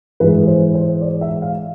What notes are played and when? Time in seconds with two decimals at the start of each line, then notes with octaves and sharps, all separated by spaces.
0.20 G#2 E3 G#3 B4
0.47 C5
0.74 C5
1.01 D5
1.21 E5
1.42 F5